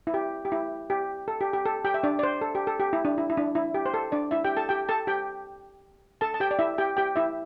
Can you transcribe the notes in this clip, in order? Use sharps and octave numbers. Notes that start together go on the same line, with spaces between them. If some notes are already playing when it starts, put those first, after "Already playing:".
E4
G4
G4
E4
G4
A4
G4
G4
A4
G4 G5
E5
D4 D5
D5
C5
A4
G4
A4
G4
E4
D4
E4
E4
D4
E4
G4
C5
A4
D4 D5
E4 E5
G4 G5
A4 A5
G4 G5
A4 A5
G4 G5
A4 A5
A5
G4 G5
D5
E4 E5
G4 G5
G4 G5
E4 E5